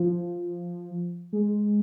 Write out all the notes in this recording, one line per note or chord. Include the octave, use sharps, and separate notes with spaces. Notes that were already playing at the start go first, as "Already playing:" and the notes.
Already playing: F3
G#3